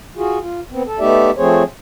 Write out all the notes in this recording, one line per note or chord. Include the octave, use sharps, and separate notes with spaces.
F4 F#4 G#4
F4
B3 C4
A4
A3 B3 D#4 G4 D5 E5
F3 A3 C4 G#4 C5 C#5